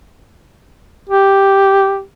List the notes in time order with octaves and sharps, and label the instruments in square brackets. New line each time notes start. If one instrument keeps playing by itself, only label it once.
[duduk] G4